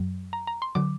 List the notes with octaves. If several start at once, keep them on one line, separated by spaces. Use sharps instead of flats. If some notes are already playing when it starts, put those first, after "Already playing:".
Already playing: F#2 F#3
A#5
A#5
C6
D3 F#3 D6